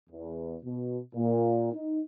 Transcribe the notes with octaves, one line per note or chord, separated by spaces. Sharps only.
E2
B2
A#2
D#4